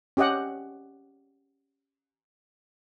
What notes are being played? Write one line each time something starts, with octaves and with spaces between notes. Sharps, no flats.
C#4 G4 D#5 F#5